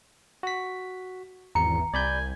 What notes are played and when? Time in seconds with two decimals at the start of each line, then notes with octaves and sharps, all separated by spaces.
0.43 F#4 B6
1.55 G#1 E2 A#5 C#7
1.94 C2 D5 G#5 B5 G6